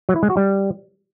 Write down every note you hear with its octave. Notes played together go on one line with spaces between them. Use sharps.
F#3
E4
G#3
F#4
G3